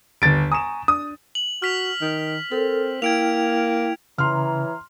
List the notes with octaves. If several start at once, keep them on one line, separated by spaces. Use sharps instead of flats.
G1 D#2 D3 A6 D7
G#5 A#5 C#6 D#6 E7
D4 D#6
F#7
F#4 F6 B6 F7
D#3
C4 A4 A#4
A#3 E4 G5 G#6 D7 F7
C#3 E3 C#5 A#5 C6 F6